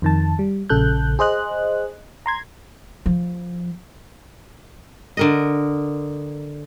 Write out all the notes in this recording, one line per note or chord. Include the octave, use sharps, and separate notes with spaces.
F2 D#3 A5
G3
A#1 C#3 A4 F#6 G6
G#4 C5 D#5 F#6
A#5 C6 G#6
F3
D3 A#4 D#5